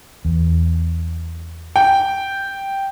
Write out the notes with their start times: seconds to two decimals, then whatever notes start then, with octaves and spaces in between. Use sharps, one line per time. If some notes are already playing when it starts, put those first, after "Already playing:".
0.25 E2
1.76 G5